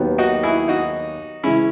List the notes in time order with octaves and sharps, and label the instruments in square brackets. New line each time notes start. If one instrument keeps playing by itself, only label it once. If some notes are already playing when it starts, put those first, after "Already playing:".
Already playing: [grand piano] D#2 D#3 F#3 B3
[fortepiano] D#4 F#4
E4 G#4
D#4 F#4
[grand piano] C#3 E3 G#3 [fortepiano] C#4 E4